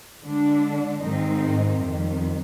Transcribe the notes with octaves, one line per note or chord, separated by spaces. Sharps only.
D3 G#3 D4
G#2 D#3 G3 C4 D#4
F2 D#3 G3